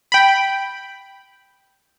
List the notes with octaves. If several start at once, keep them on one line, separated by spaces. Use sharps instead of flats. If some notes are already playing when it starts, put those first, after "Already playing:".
G5 B5